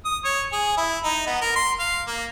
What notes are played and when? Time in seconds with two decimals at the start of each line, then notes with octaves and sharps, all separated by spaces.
0.05 D#6
0.25 C#5
0.52 G#4
0.77 E4
1.04 D#4
1.26 B3
1.42 A#4
1.56 C6
1.79 F5
2.07 A#3